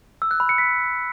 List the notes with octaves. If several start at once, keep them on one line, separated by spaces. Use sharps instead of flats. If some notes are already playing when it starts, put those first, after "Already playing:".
E6
F#6
B5
C#7
B6